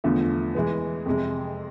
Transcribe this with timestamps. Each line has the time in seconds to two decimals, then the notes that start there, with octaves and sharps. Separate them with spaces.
0.04 E2 D3 F3 A3
0.55 E3 G#3 B3
1.06 F2 C3 G#3